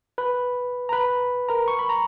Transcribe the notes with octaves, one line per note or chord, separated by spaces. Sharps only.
B4 B5
A#5
B4 B5
A#4 A#5
C#6
B5
A#5